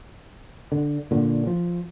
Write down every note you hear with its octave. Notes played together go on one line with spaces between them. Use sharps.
D3
A#2 D3
F3